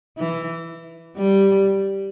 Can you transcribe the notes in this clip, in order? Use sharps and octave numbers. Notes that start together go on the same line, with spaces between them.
E3
G3